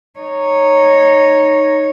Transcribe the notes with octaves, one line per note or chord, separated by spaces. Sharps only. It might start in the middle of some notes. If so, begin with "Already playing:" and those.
D#4 C#5